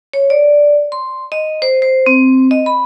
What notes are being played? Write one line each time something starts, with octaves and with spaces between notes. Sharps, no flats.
C#5
D5
C6
D#5
C5
C5
C4
D#5
B5